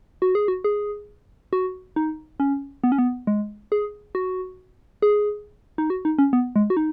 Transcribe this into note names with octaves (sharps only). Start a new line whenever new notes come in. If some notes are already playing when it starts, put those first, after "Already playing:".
F#4
G#4
F#4
G#4
F#4
D#4
C#4
B3
C#4
B3
G#3
G#4
F#4
G#4
D#4
F#4
D#4
C#4
B3
G#3
F#4
D#4